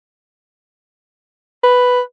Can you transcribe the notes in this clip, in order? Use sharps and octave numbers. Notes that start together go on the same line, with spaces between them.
B4